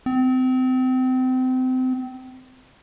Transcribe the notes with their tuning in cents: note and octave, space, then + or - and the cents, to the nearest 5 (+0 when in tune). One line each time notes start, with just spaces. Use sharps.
C4 -30